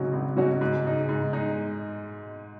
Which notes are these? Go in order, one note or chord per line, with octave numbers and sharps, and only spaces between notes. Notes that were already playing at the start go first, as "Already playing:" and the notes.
Already playing: G#1 G#2 C#3 F#3 C#4 F#4
G#1
G#2 F#3 C#4 F#4
G#2
G#3 D#4
G#2
G#3 D#4